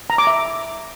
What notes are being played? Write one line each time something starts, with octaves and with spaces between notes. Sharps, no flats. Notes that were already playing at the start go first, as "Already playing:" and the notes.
A#5
D6
E5